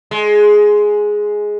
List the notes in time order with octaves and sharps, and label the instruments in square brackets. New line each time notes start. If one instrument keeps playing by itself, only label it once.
[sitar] G#3